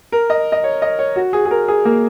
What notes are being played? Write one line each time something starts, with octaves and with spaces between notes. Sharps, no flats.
A#4
D#5
D#5
C#5
D#5
C#5
F#4
G#4
G#4
A#4
G#4
A#3